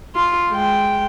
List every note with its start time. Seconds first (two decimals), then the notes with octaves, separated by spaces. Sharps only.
0.15 F4
0.52 G#3 G5